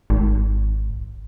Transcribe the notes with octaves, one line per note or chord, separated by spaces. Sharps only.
G#1